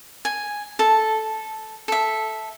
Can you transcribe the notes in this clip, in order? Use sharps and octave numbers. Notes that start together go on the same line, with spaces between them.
G#5
A4
A4 E5